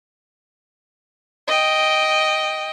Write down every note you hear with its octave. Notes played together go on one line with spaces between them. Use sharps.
D#5 G5